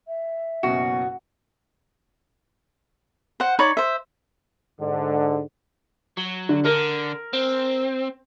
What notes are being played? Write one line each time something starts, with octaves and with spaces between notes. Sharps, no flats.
E5
F#1 B2 C#4 F#4
C5 F#5
D#4 C#5 D5 B5
C5 E5
G#2 D3
F#3
D3
D3 A#4
C4